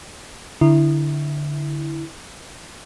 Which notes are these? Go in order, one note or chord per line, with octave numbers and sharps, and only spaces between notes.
D3 E4